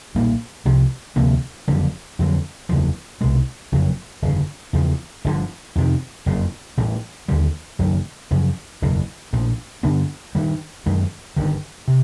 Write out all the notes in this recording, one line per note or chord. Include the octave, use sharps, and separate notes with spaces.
B1 A#2 G3 A#3
C2 C3 F3
D2 C3 F3 A#3
F#1 F2 D3 G3
F2 D3 F#3
F#1 E2 C#3 F3
C2 B2 G#3
F#1 F2 C#3 F#3
G1 F2 C#3
E2 C#3 F3
G1 F#2 D3 F3
F2 C3 D#3
F#1 F2 C#3
A1 A2 E3 G3
D#2 D3 G3
F#1 F#2 D#3 F#3
F#2 C#3 F3
F#1 E2 B2
A#1 A2 F3
G2 D3 G3 B3
G2 D#3 G3
F#2 D#3 G#3
G1 G2 D#3
C3